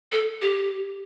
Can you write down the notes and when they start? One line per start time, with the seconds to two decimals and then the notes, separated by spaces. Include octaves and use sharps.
0.12 A4
0.42 G4